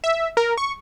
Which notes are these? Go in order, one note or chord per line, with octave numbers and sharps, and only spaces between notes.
E5
A#4
C#6